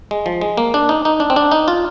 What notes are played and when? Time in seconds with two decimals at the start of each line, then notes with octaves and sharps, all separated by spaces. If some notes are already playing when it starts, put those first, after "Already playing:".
0.11 G#3
0.26 F3
0.41 G#3
0.57 A#3
0.74 D4
0.89 D#4
1.05 D#4
1.20 D4
1.30 C4
1.36 D4
1.51 D#4
1.68 F4